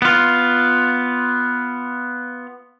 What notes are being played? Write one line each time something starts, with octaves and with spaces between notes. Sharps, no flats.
B3 F4